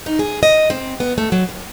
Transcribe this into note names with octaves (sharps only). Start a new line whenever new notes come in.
D#4
G#4
D#5
C4
B3
A3
F#3
D#2